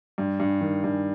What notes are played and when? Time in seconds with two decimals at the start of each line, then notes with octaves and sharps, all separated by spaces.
0.18 G2
0.40 G2
0.61 D#3
0.84 G2